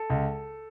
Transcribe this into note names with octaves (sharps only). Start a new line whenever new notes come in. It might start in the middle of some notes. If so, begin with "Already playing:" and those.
Already playing: A4
C#2